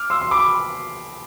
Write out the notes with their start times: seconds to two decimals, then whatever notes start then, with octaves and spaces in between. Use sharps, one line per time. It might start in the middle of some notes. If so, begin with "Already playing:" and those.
Already playing: D6 F6
0.10 C6 E6
0.21 C6
0.31 B5 D6